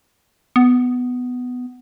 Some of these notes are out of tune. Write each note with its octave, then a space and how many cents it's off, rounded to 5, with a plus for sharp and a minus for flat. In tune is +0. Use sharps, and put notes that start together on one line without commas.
B3 +10